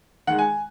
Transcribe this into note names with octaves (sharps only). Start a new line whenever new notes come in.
D#3 G#3 F#5
G#5